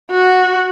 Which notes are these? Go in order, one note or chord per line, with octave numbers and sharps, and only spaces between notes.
F#4